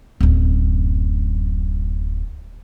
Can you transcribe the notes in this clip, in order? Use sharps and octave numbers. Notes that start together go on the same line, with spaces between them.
D1 F#2